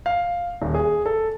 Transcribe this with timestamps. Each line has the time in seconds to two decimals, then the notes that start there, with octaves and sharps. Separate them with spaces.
0.06 F5
0.62 D#1
0.74 G#4
1.06 A4